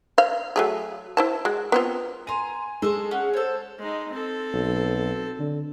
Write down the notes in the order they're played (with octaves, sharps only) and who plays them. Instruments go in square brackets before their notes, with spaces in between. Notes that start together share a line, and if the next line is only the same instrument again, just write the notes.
[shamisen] C5 F5
F#3 A3 G#4
E4 C5 A5
G#3 F#4
B3 C4 F4
[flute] G#5 [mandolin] A#5 C6 [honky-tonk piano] D#7
[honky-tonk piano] G#3 [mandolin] A4 C5 C#6
[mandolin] C#4 [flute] F#5
[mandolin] A4 C#5 [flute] C5
[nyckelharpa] G#3 D#4
C4 A4
[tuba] B1
D3